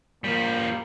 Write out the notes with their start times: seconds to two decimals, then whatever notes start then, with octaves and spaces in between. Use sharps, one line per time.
0.24 F3 G3 A#3